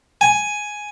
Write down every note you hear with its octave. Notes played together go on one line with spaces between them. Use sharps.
G#5